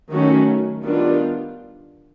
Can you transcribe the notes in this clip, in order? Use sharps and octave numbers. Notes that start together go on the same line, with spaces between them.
D#3 F#3 A3 C#4 F#4
D#3 G3 B3 D4 F4